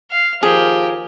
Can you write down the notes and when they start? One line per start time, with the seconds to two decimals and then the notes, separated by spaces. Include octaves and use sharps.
0.10 F5
0.43 D#2 F3 G4 G#4 A#4